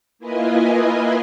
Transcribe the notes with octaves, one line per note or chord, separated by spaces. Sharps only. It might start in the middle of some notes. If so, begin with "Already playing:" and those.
A#3 E4 F4 B4 D#5 G#5